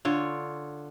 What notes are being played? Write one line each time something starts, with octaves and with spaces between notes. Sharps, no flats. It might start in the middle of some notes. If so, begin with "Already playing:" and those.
D3 F4 C#5